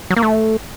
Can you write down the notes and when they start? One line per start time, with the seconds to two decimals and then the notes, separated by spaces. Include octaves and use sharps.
0.10 F#3
0.17 A#3
0.23 A3